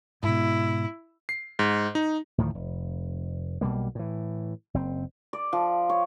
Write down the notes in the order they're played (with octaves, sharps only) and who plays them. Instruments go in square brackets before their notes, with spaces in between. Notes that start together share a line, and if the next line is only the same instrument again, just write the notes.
[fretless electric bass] G#2 B2 [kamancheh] E4
[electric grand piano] C7
G#2
D#4
[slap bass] D2 A2 D#3 F3
F1
B1 B2 G3 A#3
A2 E3
F#1 C4
[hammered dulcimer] D5
F3
C#5